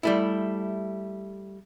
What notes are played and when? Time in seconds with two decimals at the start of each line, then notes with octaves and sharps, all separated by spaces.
0.03 G3 A3 E4